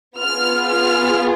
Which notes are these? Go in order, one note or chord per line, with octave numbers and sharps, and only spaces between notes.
B3 F4 G#4 F6
F6